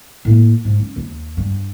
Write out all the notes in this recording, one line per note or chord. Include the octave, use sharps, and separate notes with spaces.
A2 A#3
G#2
C#4
D#2
G2